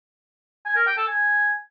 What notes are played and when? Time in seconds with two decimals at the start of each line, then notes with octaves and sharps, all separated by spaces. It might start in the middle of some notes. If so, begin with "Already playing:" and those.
0.66 G#5
0.76 A#4
0.87 G5
0.97 A4
1.08 G#5